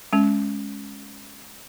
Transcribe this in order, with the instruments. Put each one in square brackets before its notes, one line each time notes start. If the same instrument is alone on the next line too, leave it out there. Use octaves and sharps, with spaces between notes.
[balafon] G#3 C#4